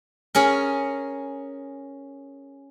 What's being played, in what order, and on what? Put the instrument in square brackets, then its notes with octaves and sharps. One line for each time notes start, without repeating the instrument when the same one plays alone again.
[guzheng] C#4 G#4 A#4